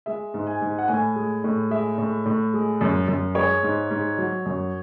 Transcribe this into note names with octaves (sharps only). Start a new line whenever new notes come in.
G#3 E5
G#2
G#5
G#2
F#5
A2 G#5
G#3
A2
G#3 E5
A2
A2
G#3
F#2
F#2
G#3 C#5
G#2
G#2
F#3
F#2